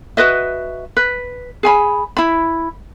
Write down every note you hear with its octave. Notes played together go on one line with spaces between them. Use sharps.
F#4 B4 D#5 E5
B4
G#4 G#5 B5
E4 B5